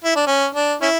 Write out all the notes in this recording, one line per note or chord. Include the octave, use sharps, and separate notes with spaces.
E4
D4
C#4
D4
C#4 E4